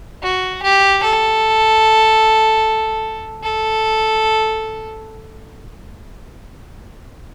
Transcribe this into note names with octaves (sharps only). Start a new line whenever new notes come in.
F#4
G4
A4
A4